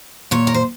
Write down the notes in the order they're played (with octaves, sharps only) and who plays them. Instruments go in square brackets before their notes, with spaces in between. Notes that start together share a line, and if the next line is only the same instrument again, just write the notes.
[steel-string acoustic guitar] A#2 C#5
A#4
C5